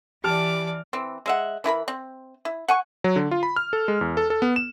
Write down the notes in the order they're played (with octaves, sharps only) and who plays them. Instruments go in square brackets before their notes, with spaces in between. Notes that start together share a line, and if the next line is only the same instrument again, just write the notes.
[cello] E3 [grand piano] G4 A5 F6 [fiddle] D5 D6
[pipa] E3 C4
G#3 E5 F#5
E3 E4 A#4 B5
C4
E4
F#5 G#5 C#6
[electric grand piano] F#3
D3
F4
B5
F6
A4
G#3
E2
A4
A4
B3
E7